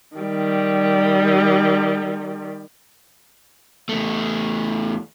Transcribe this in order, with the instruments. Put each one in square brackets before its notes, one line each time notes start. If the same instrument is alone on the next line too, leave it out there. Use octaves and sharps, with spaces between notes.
[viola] D#3 G3
[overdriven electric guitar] E2 A3